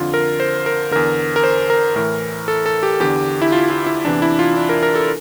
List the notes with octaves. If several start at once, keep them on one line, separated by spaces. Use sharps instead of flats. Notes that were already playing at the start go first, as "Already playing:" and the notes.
Already playing: F2 D3 F4
A#4
C5
A#4
E2 D3 A#4
A#4
C5
A#4
A2 E3 A#4
A4
A4
G4
E2 D3 G4
E4
F4
F4
E4
E2 C3 E3 D4
E4
F4
D4
A#4
A#4
A4